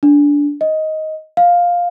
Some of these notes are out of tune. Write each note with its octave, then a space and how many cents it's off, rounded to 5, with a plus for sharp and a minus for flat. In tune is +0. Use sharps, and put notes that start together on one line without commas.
D4 -15
D#5 +10
F5 +10